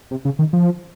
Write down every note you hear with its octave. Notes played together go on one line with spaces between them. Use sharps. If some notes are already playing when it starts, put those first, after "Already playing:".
C3
C#3
D#3
F3